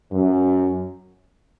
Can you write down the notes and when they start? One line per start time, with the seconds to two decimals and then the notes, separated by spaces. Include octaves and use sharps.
0.11 F#2